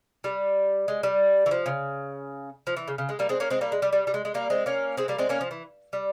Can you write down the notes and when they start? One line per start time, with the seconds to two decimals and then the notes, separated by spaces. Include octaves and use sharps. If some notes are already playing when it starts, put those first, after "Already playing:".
0.24 G3
0.88 G#3
1.03 G3
1.46 E3
1.51 F3
1.66 C#3
2.67 F3
2.77 E3
2.88 C#3
2.98 C#3
3.09 G#3
3.19 G3 A#3
3.29 G#3 C4
3.40 A#3 C#4
3.50 G#3 C4
3.61 G3 A#3
3.72 G#3
3.82 G3
3.93 G3
4.07 G3
4.14 G#3
4.25 G#3
4.34 G3 A#3
4.50 G#3 C4
4.66 A#3 C#4
4.97 G#3 C4
5.08 G3 A#3
5.18 G#3 C4
5.29 A#3 C#4
5.41 F3
5.51 E3
5.93 G3